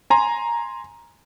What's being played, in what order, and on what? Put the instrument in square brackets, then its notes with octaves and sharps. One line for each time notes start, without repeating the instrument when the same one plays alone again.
[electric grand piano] G#5 A#5 C6